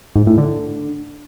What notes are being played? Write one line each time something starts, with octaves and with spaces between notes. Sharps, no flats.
G#2
A2
D3